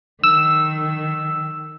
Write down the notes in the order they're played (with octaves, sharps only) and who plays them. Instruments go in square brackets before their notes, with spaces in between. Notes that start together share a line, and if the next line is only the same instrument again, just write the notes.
[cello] D#3 [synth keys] E6